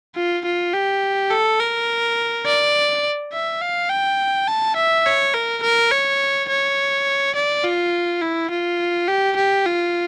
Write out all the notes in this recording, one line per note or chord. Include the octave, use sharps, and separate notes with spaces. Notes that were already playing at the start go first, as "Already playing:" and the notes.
F4
F4
G4
A4
A#4
D5
E5
F5
G5
A5
E5
C#5
A#4
A#4
C#5
C#5
D5
F4
E4
F4
G4
G4
F4